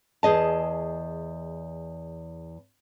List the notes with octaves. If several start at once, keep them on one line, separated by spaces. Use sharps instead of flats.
E2 G#4 D#5 A5